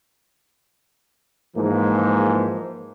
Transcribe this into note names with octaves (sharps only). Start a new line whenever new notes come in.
G#2 E3 F3 G#3 A#3